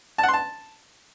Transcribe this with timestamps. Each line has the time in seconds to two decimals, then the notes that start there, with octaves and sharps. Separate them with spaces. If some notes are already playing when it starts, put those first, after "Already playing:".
0.18 A5
0.23 F#5
0.28 C6
0.33 A5